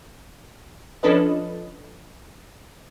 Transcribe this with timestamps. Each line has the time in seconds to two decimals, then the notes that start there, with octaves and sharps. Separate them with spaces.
1.03 F3 C#4 D4 A4 B4 D#5